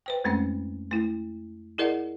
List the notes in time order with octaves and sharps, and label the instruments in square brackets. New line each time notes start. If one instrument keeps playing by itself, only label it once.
[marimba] B4 C5 G5
F2 G#3 A3 C4 C#4
A3 E4
E4 G#4 A#4 D5 D#5 F#5